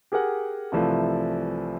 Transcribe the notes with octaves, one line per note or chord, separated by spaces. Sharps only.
G4 G#4 A#4 F#5
C2 E3 F3 A3